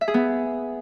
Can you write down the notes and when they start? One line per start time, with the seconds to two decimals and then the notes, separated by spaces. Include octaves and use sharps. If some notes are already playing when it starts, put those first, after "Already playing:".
0.01 E5
0.08 G#4
0.14 B3